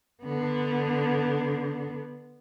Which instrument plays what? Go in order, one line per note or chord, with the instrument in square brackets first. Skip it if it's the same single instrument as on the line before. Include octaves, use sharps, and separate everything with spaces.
[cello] D3 B3